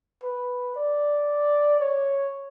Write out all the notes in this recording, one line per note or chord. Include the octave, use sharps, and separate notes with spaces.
B4
D5
C#5